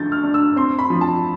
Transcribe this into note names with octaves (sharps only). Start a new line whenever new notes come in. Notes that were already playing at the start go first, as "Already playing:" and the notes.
Already playing: D3 F3 G6 A6
F6
D4
E6
C4 C6
B5
F3
A5